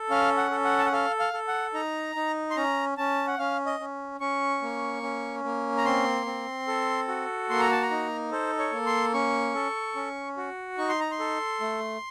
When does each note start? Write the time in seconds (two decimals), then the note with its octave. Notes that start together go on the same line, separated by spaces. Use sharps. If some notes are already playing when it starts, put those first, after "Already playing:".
Already playing: A4
0.10 C#4 F5
0.37 F#5
0.51 A4
0.65 F#5
0.79 A5
0.86 F#5
0.92 A4 F5
1.20 F5
1.34 A4
1.48 F#5
1.74 D#4 A#5
2.16 D#4
2.51 C6
2.56 C#4 A#5
2.97 C#4 A5
3.27 F#5
3.38 C#4 F5
3.66 D#5
3.80 C#4
4.20 C#4 C#6
4.62 A#3
5.03 C#4
5.44 A#3
5.77 A#5
5.85 C4 C6
6.26 C4
6.68 A4
7.08 F#4
7.50 A#3 C6
7.60 A#5
7.71 A5
7.82 A#5
7.91 D#4
8.32 A4 C5
8.59 C#5
8.72 A#3
8.86 C6
9.14 C#4 C#6
9.55 A4
9.95 C#4
10.37 F#4
10.78 D#4 C#6
10.89 C6
11.00 A#5
11.11 C6
11.19 A4
11.60 A3